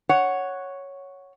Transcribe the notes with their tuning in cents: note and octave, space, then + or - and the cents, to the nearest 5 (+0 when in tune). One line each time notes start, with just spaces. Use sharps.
C#5 +0 F#5 +0